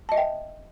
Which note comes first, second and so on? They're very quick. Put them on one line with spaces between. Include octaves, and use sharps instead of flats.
A5 D#5 E5 G5